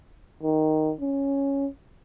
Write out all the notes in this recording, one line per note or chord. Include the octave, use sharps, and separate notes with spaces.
D#3
C#4